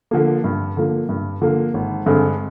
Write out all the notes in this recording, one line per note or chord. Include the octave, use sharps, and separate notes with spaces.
D3 F3 A#3
G2
D3 F3 A#3
G2
D3 F3 A#3
G#1
G2 D3 G#3 C4